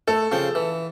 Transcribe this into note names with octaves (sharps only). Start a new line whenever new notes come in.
A3 A4
C#3 F3 G5
E3